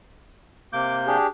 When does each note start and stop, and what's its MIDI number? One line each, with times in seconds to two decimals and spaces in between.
0.73 1.18 48
0.73 1.18 58
0.73 0.95 86
0.73 1.18 91
1.07 1.27 62
1.07 1.27 67
1.07 1.27 68